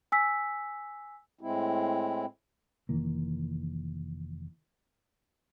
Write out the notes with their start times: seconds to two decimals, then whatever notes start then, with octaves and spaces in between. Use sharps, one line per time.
0.12 G#5 E6 B6
1.41 A2 G#3 C4 E4
2.89 F1 D#3 E3 A#3